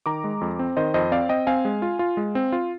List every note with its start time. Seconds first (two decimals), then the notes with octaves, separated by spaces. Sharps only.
0.06 D#3 A#5 D6
0.24 G#3
0.41 F2
0.59 C4
0.77 D#3 C5 D#5
0.94 F2 C5 D#5
1.12 C4 D5 F5
1.29 C4 D#5 G5
1.47 C4 F5 G#5
1.65 G#3
1.82 F4
1.99 F4
2.17 G#3
2.35 C4
2.52 F4